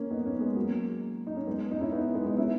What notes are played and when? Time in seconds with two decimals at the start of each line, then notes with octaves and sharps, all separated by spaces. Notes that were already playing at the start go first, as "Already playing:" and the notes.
Already playing: A#3 C#4
0.10 B3 D#4
0.26 A#3 C#4
0.41 G#3 B3
0.56 F#3 A#3
1.27 D#4
1.37 C#4
1.47 G#3 B3
1.71 D#4
1.81 C#4 E4
1.92 B3 D#4
2.14 G#3 B3
2.26 B3 D#4
2.37 C#4 E4